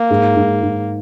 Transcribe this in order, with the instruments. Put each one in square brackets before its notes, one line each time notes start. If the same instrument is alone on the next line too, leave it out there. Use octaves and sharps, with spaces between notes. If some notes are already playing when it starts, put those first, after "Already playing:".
Already playing: [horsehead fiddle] A#3
[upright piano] G#2
G#2
G#2